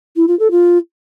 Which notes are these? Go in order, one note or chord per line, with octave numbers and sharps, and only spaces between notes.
E4
F4
A4
F4